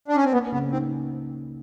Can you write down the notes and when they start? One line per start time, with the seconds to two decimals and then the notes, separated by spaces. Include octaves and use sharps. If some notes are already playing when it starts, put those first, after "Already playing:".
0.08 D4
0.16 C#4
0.25 C4
0.32 A#3 B3
0.52 C#3 B3
0.72 C4 D#4